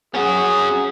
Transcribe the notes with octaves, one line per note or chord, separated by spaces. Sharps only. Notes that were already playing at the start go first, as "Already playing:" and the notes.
C#4 F#4 G#4